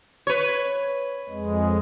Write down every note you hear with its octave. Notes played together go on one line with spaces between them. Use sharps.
B4 C#5
F2 G#3